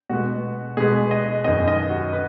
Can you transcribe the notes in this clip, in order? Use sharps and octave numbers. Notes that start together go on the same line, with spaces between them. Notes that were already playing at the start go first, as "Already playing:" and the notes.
B2 G#3 B3 F#4
B2 G#3 B3 G#4
D#5
F#2 D#3 B3 D#5
D#5
F#4
B4